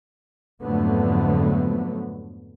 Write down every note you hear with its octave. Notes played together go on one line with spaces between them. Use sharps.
F2 G#2 D3 F#3 A3 B3